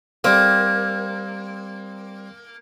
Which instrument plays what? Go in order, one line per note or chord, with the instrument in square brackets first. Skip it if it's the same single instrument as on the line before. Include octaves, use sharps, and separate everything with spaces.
[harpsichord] G3 C4 [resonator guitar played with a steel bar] A#3